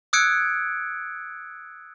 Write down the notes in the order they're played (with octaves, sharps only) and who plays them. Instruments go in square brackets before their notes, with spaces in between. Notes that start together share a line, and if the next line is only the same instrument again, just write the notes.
[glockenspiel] D#6 E6 F#6 G#6 C#7 D7